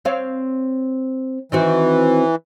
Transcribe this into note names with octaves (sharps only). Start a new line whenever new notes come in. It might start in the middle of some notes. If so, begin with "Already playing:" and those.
C4 C#5 F5
D#3 E3 C4 F#4